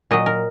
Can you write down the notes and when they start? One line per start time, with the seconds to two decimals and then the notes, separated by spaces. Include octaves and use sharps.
0.11 A#2 F#3 D#5
0.26 A#4